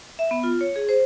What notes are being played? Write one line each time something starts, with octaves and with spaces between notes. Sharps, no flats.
E5
B3
F4
C#5
G#4
C5